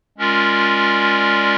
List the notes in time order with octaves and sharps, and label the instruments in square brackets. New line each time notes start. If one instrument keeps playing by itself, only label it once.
[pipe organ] G#3 C#4 F4 A#4 D5